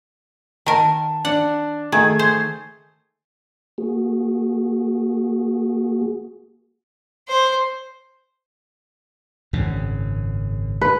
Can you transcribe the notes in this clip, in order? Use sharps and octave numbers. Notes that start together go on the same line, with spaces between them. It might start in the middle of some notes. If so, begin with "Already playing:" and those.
D#3 A#4 A5
D4 F#5
D#3 A3 G#4 G#6
C5
A#3 F#4 G#4
C5
G#1 F#2 C#3
B4